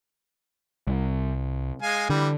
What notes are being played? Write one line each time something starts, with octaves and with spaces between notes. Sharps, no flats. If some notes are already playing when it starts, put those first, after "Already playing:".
C2
G#3 F5 G#5
D3 E3 G3